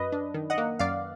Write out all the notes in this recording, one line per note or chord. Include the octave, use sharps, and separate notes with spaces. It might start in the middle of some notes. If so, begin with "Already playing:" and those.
Already playing: F#2 B4 D#5
D4
D#3
D#5 F#5
A#3
F#2 D5 F5